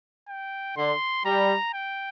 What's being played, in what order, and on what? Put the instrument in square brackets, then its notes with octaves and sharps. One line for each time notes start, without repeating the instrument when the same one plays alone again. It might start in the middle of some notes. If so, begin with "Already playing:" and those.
[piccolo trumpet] G5
[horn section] D3 [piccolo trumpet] C6
[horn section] G3 [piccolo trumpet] A#5
[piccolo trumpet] G5